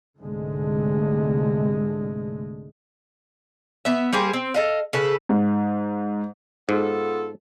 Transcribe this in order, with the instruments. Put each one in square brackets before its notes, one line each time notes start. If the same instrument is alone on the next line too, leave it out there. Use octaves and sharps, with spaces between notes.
[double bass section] C2 G#2 D3 G#3 A3
[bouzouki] B3 E5
G3 A#3 G#4 C5
C4
A4 D#5 F5
C#3 A4 B4
[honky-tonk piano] G#2
[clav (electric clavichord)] G#2 [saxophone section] B3 F4 A4